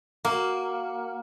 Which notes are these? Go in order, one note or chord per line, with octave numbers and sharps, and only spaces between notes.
A#3 F#4